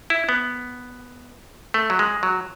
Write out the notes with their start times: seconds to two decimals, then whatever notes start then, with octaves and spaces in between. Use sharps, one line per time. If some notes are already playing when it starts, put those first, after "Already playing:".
0.10 E4
0.29 B3
1.74 A3
1.90 F#3
1.99 G#3
2.23 F#3